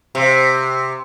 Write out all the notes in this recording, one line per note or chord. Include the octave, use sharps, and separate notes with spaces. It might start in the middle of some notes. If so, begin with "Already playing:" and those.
C3